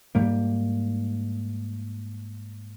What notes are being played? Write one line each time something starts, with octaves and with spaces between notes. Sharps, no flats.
G#2 G3 A#3